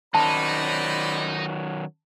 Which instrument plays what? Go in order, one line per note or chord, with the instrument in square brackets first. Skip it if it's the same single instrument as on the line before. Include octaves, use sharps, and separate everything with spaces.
[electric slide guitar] D#3 F#3 C#4 [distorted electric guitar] D#4 [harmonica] C5 D5 B5 [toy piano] A5